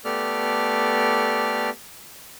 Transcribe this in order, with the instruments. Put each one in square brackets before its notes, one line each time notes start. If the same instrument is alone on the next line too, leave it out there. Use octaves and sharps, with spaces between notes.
[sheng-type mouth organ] A3 B3 G4 A4 D5 F6